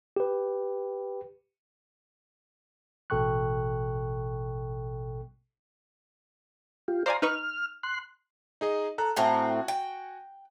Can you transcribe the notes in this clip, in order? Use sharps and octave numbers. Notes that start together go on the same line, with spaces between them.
G4 B4
A1 B2 A4 G5 C#6 F#6
F4 G4
C5 D5 F5 G#5 A#5 C6
D#4 B4 C#6 F6
C6 F#6
D#4 G#4 D#5
A4 A#5 F#6
A2 C4 F#4 F#5 G#5 A#5
G5